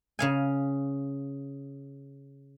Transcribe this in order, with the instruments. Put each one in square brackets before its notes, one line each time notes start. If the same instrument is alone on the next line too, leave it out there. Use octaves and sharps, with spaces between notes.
[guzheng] C#3 F5 G#5